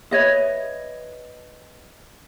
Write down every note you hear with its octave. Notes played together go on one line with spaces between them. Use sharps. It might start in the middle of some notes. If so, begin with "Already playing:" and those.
B4 C#5 D#5 E5